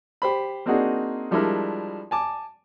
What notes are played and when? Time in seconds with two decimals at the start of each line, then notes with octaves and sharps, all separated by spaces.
0.22 G4 C5 B5
0.66 A#3 C4 D4 D#4 F#4 G#4
1.31 F3 G3 G#3 D4 E4 A#4
2.11 G#5 A5 D6